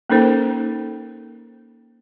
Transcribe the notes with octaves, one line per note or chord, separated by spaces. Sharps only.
A#3 C#4 D#4 A4 A#4 C5